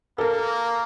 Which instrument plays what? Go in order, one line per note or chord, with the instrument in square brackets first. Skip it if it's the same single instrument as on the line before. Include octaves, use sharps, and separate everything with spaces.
[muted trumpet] A#3 [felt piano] A4 A#4